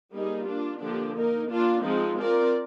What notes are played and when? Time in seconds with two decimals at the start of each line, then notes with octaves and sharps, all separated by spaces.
0.12 G3 A#3 D#4 G#4
0.47 A#3 D4 F4
0.80 D3 F3 A#3 D4 G4
1.15 A#3 D#4 A#4
1.50 A#3 D4 F4
1.84 F3 G#3 C4 D#4
2.18 C4 F4 A#4 D5